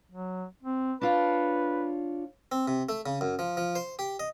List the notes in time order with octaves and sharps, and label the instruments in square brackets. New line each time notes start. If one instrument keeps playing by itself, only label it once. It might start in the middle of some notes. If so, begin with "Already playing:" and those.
[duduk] F#3
C4
[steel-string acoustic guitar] D4 F4 C#5 [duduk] B4
[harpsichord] C4
C3
A3
C#3
F#2
F3
F3
C5
G4
D#5